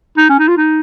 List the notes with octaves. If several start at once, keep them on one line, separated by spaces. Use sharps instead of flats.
D#4
C#4
D#4
F4
D#4